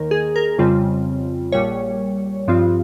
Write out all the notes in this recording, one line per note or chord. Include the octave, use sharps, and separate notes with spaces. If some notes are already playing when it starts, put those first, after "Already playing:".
Already playing: D#2 D#3 A#3 A#4
G#4
A#4
F2 C#3 G3 C4 F4
A#1 A#2 G3 C#5
G2 F3 C4 F4